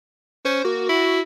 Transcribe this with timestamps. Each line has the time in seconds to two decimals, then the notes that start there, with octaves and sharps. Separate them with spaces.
0.45 C#4 C5
0.65 A#3 F#4
0.89 E4